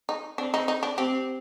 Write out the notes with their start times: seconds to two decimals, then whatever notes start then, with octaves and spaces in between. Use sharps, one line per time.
0.09 D#4
0.38 C4 D4
0.54 D#4
0.68 D#4
0.83 D4
0.97 C4 G4